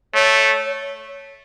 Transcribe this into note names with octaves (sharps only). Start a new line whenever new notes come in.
A3 C#5